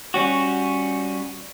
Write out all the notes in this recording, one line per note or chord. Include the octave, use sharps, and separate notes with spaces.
G3 C#4 F#4